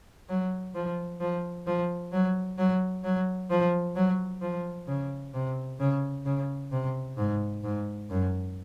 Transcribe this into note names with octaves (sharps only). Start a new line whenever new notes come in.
F#3
F3
F3
F3
F#3
F#3
F#3
F3
F#3
F3
C#3
C3
C#3
C#3
C3
G#2
G#2
F#2